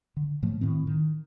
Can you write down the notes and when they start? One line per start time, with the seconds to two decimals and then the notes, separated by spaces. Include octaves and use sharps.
0.17 D3
0.43 A2 F3 A3
0.61 A2 D#3 C4
0.87 D#3